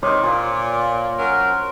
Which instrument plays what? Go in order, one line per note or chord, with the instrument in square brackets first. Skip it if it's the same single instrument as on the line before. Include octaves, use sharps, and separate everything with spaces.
[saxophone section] C3 D#3 [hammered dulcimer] C5 C#5 D6
[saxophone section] A#2 [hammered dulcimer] F4
[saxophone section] F#3 C#4 A#4